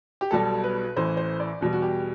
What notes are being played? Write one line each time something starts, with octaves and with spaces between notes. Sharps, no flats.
G4
B1 B2 G3 A4
B4
A1 A2 E3 C5
C5
D5
E2 B2 G3
F#4
G4